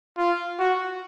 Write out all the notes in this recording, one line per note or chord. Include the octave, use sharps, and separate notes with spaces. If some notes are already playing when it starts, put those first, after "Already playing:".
F4
F#4